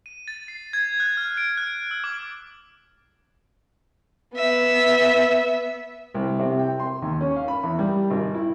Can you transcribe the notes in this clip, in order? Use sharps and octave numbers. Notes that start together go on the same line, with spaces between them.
D#7
A6
C7
G#6
F#6
F6
D7
F#6
E6
D6
B3 E5
C2
C3
G5
C6
D#2
C#4
F5
B5
E2
G3
G#1
E4